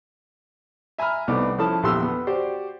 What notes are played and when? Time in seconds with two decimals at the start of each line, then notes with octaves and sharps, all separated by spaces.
0.98 E5 G#5 A#5 B5 F6
1.28 C2 A3 B3 D#4 D5 D6
1.58 F3 C#4 E4 A4 A5
1.83 A#1 E2 D3 G4 C6 E6
2.02 B3
2.27 F#4 G4 C5 D5